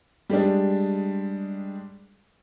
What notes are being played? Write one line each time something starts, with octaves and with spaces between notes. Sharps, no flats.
G3 G#3 D4